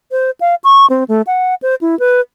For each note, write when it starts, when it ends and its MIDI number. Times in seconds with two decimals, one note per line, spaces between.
0.11 0.30 72
0.40 0.55 77
0.64 0.86 85
0.90 1.04 60
1.08 1.22 57
1.27 1.54 78
1.62 1.75 72
1.81 1.98 64
1.99 2.21 71